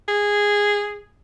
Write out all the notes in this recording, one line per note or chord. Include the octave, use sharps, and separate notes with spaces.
G#4